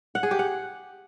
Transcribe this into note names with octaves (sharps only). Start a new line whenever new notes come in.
F#5
G#4
G4
F#5